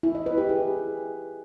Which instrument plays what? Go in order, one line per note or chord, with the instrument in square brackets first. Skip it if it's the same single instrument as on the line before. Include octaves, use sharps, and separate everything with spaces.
[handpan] E4
D#5
B4
G4
G#4